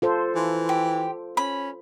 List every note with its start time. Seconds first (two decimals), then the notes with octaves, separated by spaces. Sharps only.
0.02 F4 A4 C5
0.35 E3
0.69 G4
1.37 C#4 B5